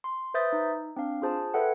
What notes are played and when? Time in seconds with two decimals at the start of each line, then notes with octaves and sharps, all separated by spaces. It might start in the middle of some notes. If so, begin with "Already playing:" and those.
0.04 C6
0.34 B4 C5 E5 D#6 G6 A6
0.53 D#4
0.96 C4 D4 F5
1.22 F4 G#4 C5 A5
1.54 A4 B4 C#5 E5 F#5 G5